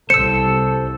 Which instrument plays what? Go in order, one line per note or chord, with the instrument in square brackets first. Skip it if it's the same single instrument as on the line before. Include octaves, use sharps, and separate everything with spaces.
[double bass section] C2 [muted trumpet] A4 [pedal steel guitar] C5 E6 [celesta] C#7